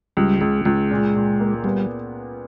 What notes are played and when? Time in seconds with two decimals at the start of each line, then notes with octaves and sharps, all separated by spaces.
0.17 C#2 G3
0.41 C#2 G#3
0.65 C#2 G#3
0.91 A#2
1.16 A#2
1.40 A#3
1.64 G3 B3